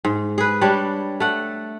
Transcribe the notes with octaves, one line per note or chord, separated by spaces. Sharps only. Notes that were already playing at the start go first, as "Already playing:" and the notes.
G#2
G#4 B4
G3 D4 C#5
A3 F#5